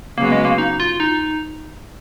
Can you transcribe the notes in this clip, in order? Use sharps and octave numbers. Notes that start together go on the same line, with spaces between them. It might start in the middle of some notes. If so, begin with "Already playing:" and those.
C#3 F#3 A#3 B3
G#3
A#3
D#4
F4
D#4